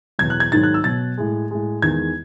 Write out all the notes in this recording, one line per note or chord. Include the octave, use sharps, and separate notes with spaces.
E2 B2 F#3 G#6
F#6
G#6
G#2 D#3 F#3 A6
F#6
E6
B2 F#3 A6
A2 G#3
A2 G#3
E2 D#3 G#3 G#6